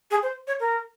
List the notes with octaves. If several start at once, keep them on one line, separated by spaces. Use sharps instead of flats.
G#4
C5
C#5
A#4